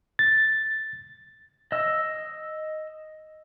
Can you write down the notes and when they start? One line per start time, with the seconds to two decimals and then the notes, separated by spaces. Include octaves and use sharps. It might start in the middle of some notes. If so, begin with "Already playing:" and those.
0.19 A6
1.72 D#5 E6